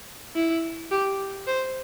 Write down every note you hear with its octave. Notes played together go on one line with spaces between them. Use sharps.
E4
G4
C5